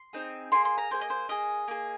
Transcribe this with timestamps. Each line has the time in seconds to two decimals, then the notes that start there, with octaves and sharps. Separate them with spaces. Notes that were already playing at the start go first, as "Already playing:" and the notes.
Already playing: C6
0.13 C4 D#4 G#4
0.52 A#3 G#4 C6
0.65 C6
0.78 A#5
0.91 A#3 G#4 C5
1.01 D#5
1.10 C5
1.29 A#3 G#4 D#5
1.68 A#3 G#4